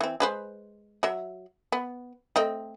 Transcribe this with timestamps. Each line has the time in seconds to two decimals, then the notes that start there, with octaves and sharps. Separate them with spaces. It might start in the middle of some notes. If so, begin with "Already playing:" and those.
0.01 E3 C4
0.20 G#3 B4 C5
1.03 F#3 E5
1.72 B3
2.36 A3 C4 D#5